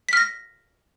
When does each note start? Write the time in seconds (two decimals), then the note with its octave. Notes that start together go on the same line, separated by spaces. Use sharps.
0.09 B6
0.13 F6
0.17 A#6